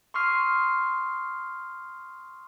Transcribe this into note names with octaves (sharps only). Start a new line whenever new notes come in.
C6 C#6 D#6 F6 C7